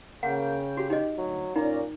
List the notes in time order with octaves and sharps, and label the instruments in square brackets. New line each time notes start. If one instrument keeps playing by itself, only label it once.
[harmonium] C#3 G5 [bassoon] A#3 [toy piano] F#5
[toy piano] F#4 [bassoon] G4
[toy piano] D#4 D#5 [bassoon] G4
[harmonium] D2 [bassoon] F#3
[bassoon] A#2 [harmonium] C#4 D5 A#5 [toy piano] D#4